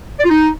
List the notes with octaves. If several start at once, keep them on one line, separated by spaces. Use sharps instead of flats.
D5
F4
D#4